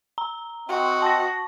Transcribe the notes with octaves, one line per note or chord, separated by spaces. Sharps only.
A#5
C4 F#4 D#5
A5 C#6 A#6